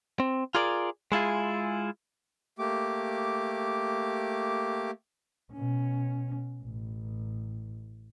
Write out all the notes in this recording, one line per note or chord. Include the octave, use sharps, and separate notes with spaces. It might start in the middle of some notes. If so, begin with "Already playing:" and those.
C4
F4 G#4 A#4 D5
G#3 E4 F4 G#4
A3 A#3 G4 D6
B2 C#4
A1